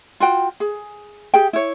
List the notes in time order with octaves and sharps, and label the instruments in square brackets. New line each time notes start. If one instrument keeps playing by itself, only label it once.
[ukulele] F4 F#4 G5
G#4
G4 G#4 G5
E4 C#5